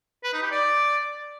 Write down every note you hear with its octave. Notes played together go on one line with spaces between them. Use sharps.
B4
D#4
G4
D5